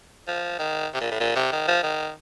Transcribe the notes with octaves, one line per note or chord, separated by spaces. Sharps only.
F3
D#3
C3
A#2
A2
A#2
C3
D#3
F3
D#3